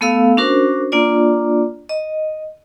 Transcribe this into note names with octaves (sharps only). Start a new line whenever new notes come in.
A3 B3 A4 F5 E6
C#4 D4 F#4 A#4 C5
A#3 D4 F4 D5
D#5